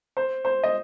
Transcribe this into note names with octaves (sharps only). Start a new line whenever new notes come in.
C5
C5
D#5